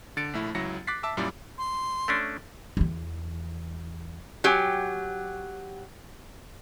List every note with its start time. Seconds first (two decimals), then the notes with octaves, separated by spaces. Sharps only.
0.17 D3 A6 C#7 D7
0.33 A#1 A3 E4
0.55 C#2 F#3 E4 A#6 C#7
0.87 D6 F#6 A6 B6 C7
1.03 E5 A5 D6 E6
1.17 F#2 A#2 G3 E4 D5 B5
1.58 C6
2.08 A3 C#4 D4
2.77 E2 E3
4.44 F#3 G4 G#5